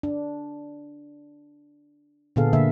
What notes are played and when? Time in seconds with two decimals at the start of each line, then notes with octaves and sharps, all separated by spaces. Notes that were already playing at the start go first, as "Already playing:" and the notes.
0.03 D4
2.36 A#2 D3 B3 G#4 A4 F5
2.53 D3 A#3 E5